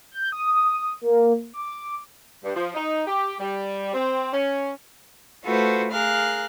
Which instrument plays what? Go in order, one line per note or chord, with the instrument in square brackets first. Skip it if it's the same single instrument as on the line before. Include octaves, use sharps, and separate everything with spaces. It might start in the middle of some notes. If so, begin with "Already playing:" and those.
[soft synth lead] G6
D#6
A#3
D6
[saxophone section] G2
F3
D#4
G4
G3
C4
C#4
[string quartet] A3 F4 F#4 A4 B4 C5
G#4 A#4 F5 F6 F#6